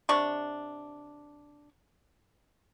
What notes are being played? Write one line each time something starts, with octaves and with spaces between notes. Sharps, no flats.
C3 D4 C#6